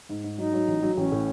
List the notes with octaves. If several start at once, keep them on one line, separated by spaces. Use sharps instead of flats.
G#2
G#2
F#3 D#4
F#3
A1
F#3
A1 C#4
A2